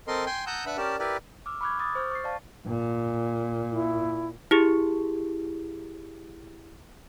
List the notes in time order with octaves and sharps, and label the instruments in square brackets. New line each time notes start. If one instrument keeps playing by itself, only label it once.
[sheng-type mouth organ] C4 A4 A#4 D#5 C6
G5 G#5 C6
F#5 A5 A#5 D#6 E6 G6
D4 B4 E5 F#5 B5
C#4 G4 A#4 D5 A5
E4 G4 A#4 B4 D5
[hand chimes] D6 E6 F6
B5 C#6 D6 F6 F#6 G#6
D6 D#6 A6
C5 C#6 F6 G6
C#6 A6 C7
D5 F5 A5
[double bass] A#2
[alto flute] E4
[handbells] E4 G4 G#4